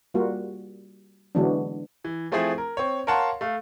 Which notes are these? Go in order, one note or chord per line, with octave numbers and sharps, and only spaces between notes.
G3 A#3 F4 F#4
D3 E3 F#3 G#3 B3 D4
E3
F3 A3 C4 E4 G#4
A#4
C4 C#5
A#4 C#5 F5 F#5 A5 C6
A3 F5